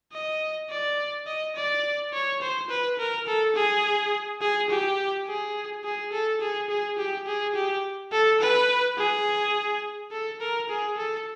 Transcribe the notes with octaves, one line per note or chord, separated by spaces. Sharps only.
D#5
D5
D#5
D5
C#5
C5
B4
A#4
A4
G#4
G#4
G4
G#4
G#4
A4
G#4
G#4
G4
G#4
G4
A4
B4
G#4
A4
A#4
G#4
A4